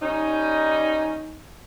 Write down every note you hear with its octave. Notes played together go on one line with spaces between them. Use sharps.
G3 C#4 D#4